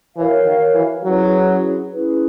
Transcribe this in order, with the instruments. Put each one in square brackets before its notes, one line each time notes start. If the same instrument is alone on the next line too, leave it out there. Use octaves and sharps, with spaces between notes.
[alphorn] E3 [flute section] F#4 A#4 C#5 F5
[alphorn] D#3
E3
[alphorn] F#3 [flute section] C#4 E4 G#4 B4
[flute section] C#4 E4 G#4 B4